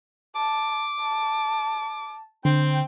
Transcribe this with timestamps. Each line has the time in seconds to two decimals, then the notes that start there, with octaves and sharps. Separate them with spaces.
0.36 A5 D6
1.01 A5
2.45 D3 C4 G5